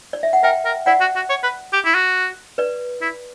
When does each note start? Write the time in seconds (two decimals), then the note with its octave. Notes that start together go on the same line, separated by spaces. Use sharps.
0.13 D5
0.23 E5
0.33 F#5
0.43 A#4 E5 G5
0.65 A#4
0.86 E4 D5 F#5
1.01 F#4
1.16 F#4
1.30 C#5
1.43 B4
1.73 G4
1.85 E4
1.95 F#4
2.58 B4 D5
3.02 E4